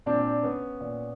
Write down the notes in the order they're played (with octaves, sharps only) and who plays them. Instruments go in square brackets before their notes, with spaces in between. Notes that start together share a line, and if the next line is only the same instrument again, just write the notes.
[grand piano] A#2 C4 D4
B3 C#4
A#2